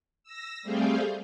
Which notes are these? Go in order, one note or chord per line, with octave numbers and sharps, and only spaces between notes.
E6 A#6
G3 A3 C4 G#4 F5 G5